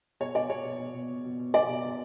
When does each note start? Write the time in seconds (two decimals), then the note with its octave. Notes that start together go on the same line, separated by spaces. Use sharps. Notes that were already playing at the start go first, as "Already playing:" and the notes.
0.20 B2 C#5
0.35 B2 D5
0.50 B2 C#5
0.64 B2
0.80 B2
0.94 B2
1.09 B2
1.25 B2
1.39 B2
1.54 B2 D5
1.69 B2
1.84 B2